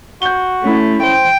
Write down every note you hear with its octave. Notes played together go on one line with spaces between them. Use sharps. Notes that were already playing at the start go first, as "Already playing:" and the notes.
F#4 G6 G7
A3 C#4 E4
C5 G5